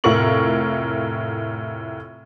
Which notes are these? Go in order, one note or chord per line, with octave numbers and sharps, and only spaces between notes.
F1 A2 F4 A#4 C#6 F#7